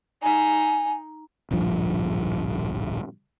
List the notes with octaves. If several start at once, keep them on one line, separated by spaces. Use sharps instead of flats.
D#4 G#5
D1 A#1 G2 F3